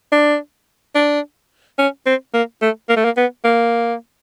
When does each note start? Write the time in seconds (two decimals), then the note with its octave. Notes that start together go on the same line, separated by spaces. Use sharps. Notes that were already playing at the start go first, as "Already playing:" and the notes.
0.12 D4
0.95 D4
1.79 C#4
2.06 C4
2.34 A#3
2.62 A3
2.89 A#3
2.97 A3
3.05 A#3
3.17 B3
3.45 A#3